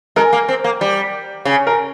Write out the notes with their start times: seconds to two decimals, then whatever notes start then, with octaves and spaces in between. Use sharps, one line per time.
0.16 G#3 A#4
0.33 A#3
0.49 C4
0.64 A#3
0.81 G3
1.45 C#3
1.67 A#4